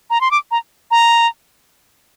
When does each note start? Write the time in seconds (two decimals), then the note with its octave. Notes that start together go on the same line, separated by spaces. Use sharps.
0.10 A#5
0.21 C6
0.31 D6
0.51 A#5
0.91 A#5